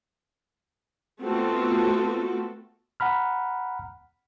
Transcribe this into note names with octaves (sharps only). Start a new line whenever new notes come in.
A3 B3 C4 F4 F#4 A4
F#5 A#5 B5 F6